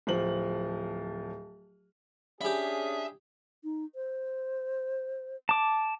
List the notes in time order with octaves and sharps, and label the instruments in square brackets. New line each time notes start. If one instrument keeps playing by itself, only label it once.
[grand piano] D1 F3 F#7
[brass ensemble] C#4 D4 G#4 [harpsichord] G4 B5 [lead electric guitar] E5
[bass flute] D#4
C5
[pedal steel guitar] A5 D6